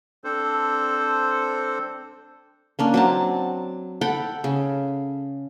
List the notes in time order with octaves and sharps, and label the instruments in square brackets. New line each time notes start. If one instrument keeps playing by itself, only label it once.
[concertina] C4 D4 A4 C5
[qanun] A#3 C#4 D4
F#3 C4 A5
A4 F#5 G5 B5
C#3